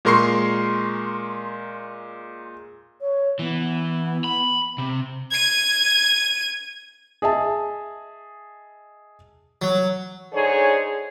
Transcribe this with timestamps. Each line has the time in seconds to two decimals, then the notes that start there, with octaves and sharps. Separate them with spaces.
0.05 A#2 G#3 A#4 C6 C#6 C7
3.01 C#5
3.39 E3 B3
4.24 B5
4.78 C3
5.31 G#6 D#7
7.22 G#4 D#5 E5 A5
9.62 F#3
10.33 D3 D#4 G#4 C5 C#5